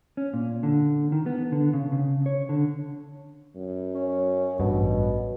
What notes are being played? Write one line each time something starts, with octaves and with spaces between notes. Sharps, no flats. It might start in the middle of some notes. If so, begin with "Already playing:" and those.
C#4
A#2
D3
D#3
B3
D3
C#3
C#3
C#5
D3
F#2
C#4
A1 G2 B2